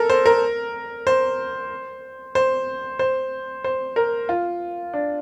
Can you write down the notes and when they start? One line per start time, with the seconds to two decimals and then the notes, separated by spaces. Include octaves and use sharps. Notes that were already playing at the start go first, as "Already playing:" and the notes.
Already playing: A4 A#4
0.10 C5
0.26 A#4
1.07 C5
2.35 C5
2.99 C5
3.64 C5
3.96 A#4
4.29 F4
4.93 D4